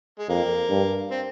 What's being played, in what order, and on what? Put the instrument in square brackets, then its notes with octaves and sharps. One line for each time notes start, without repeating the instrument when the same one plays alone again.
[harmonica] G#3
[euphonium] F2 [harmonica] A#3
[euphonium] G2
[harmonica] C4